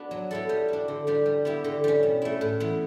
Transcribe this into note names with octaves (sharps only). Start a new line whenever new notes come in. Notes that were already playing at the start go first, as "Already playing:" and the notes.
Already playing: B3 D4 F#4
F#3
B3 E4 A4
G3
D4 F#4
D3
G3 D4
G3
B3 E4 G4
D3
G3 C#4
B2
A3 E4
A2
E3 B3